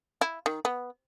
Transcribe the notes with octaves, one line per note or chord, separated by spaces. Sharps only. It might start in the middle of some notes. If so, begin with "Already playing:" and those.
E4
D#3
B3